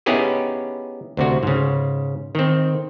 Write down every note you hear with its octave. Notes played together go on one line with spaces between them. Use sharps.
B3 C#4 D#4 E4 G4 G#4
D2 C3 F#4
G#2 C#3
D#3 C4